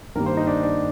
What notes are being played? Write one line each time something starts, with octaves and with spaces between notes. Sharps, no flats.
G2 D#3 G3 A#3 A#4
C5
D#4
D4
D4